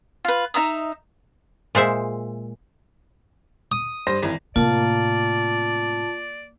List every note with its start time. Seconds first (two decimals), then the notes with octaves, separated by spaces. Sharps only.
0.25 F4 B4
0.54 D#4 E5 A#5 D#6
1.75 A#2 G#3 C5 E5
3.72 D#6
4.07 G2 C5 A#6
4.23 G#1 E3
4.56 A2 C3 A#3 F4 D5 A5